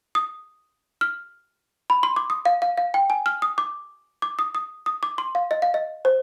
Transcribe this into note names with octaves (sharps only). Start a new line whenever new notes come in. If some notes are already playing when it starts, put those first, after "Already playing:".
D#6
F6
B5
C6
D6
D#6
F5
F5
F5
G5
G#5
F6
D#6
D6
D6
D#6
D#6
D#6
D6
C6
F5
D#5
F5
D#5
C5